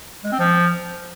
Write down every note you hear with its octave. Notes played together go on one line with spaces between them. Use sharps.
G#3
C4
F3